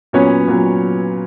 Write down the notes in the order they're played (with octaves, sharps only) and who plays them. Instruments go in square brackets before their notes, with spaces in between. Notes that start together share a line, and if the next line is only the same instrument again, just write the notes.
[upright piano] A#2 F#3 B3 C#4 C#5
A#2 F#3 B3